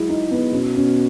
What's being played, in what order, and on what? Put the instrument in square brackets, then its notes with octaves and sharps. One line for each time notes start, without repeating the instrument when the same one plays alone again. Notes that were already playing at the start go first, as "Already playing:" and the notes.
Already playing: [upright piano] F#3 G#3 E4
D#4
B3
[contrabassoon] B2 [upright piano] C#4
[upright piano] C#4